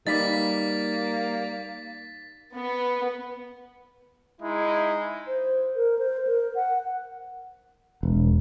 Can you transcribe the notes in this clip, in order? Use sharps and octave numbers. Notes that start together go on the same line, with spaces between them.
G3 A#3 D#4 B4 D5 A6 B6
B3
G#3 D#4 E4
C5
A#4
C5
A#4
F#5
E1